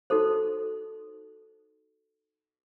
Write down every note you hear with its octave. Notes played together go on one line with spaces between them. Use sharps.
D#4 F#4 A4 C5